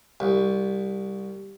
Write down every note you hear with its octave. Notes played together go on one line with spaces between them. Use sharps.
C2